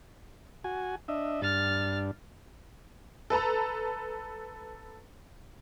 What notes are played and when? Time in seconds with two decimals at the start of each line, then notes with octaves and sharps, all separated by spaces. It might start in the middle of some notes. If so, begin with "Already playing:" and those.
0.64 F#4 G#5
1.08 D4 D#5 E5
1.41 G2 D4 F6 A6
3.30 A4 B4 A5 A#5